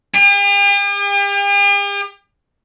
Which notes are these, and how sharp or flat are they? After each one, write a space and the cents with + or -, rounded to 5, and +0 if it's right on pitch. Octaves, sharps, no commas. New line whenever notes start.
G4 +45